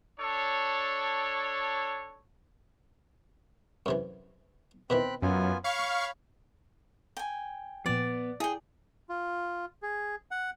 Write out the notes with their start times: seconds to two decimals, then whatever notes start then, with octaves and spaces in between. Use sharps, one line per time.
0.20 D4 A4 C#5
3.86 F#2 C3 E3
4.90 B2 D#3 E3 C4 B5 F#6
5.22 F#2 B3 F4 G#5
5.64 C#5 F5 B5 C#6 F6
7.17 G5 G#5
7.86 A#2 F3 B3 D5
8.40 E4 G#4 G5
9.09 F4
9.82 G#4
10.31 F#5